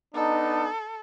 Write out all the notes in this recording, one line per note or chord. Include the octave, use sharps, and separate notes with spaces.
B3 D4 D#4 A4